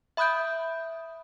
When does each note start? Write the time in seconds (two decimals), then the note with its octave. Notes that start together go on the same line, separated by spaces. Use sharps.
0.17 E5 B5 D#6 F#6 G6 D7